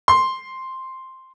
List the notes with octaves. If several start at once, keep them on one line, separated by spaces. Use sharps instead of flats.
C6